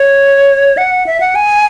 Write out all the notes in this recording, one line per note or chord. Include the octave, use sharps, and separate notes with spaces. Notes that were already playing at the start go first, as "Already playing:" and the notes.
Already playing: C#5
F#5
E5
F#5
G#5